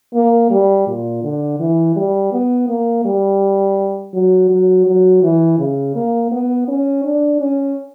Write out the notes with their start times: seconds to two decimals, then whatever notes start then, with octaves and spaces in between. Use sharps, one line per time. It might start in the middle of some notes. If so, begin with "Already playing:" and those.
0.14 A#3
0.50 G3
0.87 A#2
1.24 D3
1.60 E3
1.96 G3
2.32 B3
2.69 A#3
3.05 G3
4.14 F#3
4.50 F#3
4.86 F#3
5.23 E3
5.59 C#3
5.95 A#3
6.31 B3
6.68 C#4
7.04 D4
7.41 C#4